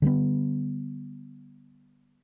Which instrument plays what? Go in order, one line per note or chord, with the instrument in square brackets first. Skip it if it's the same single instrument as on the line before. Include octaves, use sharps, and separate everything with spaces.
[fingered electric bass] D3 G3 A#3 B3